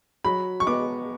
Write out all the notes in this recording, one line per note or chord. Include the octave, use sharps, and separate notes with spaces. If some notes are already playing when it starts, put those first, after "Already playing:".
F#3 B5
C#6
B3 D6